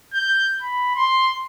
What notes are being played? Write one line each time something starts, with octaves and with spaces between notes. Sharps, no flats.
G6
B5
C6